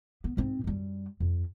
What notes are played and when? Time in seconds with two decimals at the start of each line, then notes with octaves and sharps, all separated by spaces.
0.24 B3
0.37 G#2 C4
0.64 F#2 G3
1.20 F2